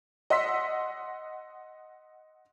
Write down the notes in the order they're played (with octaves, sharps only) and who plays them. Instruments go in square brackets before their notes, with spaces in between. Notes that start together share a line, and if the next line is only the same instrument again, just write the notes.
[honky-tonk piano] D#5 F#5 C6 E6 B6